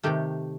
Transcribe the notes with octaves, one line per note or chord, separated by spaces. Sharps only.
C3 D#3 A3 G4